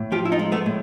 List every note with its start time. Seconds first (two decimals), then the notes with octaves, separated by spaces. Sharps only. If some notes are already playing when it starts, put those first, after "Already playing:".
Already playing: A2
0.12 F3 F4 G4
0.25 E4
0.32 D#4 F4
0.39 G#3
0.52 A3 B3
0.66 A2